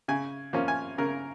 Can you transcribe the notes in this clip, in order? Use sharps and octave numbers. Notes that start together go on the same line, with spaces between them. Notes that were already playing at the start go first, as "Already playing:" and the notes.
C#3 G#5
F3 A#3 C#4
G#5
C#3 A#4